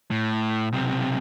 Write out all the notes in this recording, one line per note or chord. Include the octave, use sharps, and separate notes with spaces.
A2
B1 C3